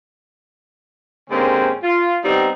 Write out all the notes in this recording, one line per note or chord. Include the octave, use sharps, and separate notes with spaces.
G#2 D3 A#3 C4 C#4 G4
F4
G3 B3 C4 D#4